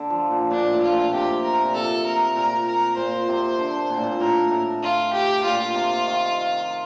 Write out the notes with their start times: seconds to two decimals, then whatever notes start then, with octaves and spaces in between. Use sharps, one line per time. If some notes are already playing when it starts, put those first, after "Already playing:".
Already playing: D3
0.10 F3
0.31 A#2
0.51 A#2 D4
0.71 A2
0.82 F4
0.92 A#2
1.13 C3 G4
1.43 A#4
1.64 A#2
1.74 C3 A4
2.06 A#4
2.35 A#2 A#4
2.67 A#4
2.97 A#2 C5
3.28 C3
3.59 D3
3.90 A#2
3.97 A2
4.04 A#2
4.20 A2 A#4
4.51 A2
4.83 F4
5.13 G4
5.43 A#2 F4
5.74 C3
6.05 D#3